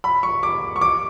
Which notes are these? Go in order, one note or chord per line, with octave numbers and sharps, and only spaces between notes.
B5
C#6
D6
C#6
D6